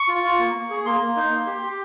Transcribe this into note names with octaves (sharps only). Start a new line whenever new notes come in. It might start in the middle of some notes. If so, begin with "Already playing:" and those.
Already playing: C#6
F4
F4
A#3
A#3
G#4
A#3 C6
A#3
D#4
A#3
G4
G4